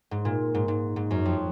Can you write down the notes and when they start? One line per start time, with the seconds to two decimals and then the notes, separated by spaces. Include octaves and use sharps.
0.11 G#2
0.25 A#2
0.54 G#2
0.68 G#2
0.96 G#2
1.11 F#2
1.25 F2